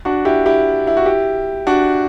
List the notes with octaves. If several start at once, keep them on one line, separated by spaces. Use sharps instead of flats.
D4 F#4
E4 G4
E4 G4
E4
F#4
E4 G4
D4 F#4